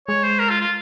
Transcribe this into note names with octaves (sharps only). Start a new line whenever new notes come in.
G#3 C#5
C5
A#4
F4
F4